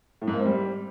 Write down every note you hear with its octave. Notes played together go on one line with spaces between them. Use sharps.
A2
G#2
A#3
C4
G3